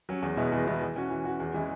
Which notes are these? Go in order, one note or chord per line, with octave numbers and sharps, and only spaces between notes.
F#3 C#4
E2
B2 G#3 B3 E4
E2
B2 G#3 B3 E4
E3
C#4 F#4
E3
C#4 F#4
E2
E3 G#3 C#4 E4